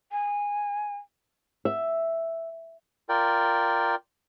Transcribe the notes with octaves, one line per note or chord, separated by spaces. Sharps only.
G#5
E5
F4 A#4 D5 G5